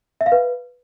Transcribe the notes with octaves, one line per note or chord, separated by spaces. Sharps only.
E5
F5
B4